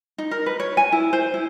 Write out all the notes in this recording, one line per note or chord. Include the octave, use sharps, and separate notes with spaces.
D#4
A#4
B4
C#5
G#5
E4
C5
E4